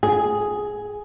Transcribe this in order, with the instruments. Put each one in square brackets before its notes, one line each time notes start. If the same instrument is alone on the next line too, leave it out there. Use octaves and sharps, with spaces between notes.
[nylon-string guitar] G#4